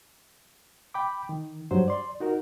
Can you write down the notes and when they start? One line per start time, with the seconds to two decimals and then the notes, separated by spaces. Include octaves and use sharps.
0.94 G5 B5 D6
1.29 D#3
1.71 G2 F#3 C5
1.88 D5 C6
2.20 D#4 F#4 A#4